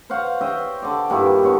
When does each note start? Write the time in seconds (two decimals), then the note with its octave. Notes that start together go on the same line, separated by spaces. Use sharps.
0.10 C5 C#5 F5 F#5
0.41 D#5 E5 G5
0.82 D3 D5
1.10 G2 A#2 D#3 E4
1.43 D3 B3 C#5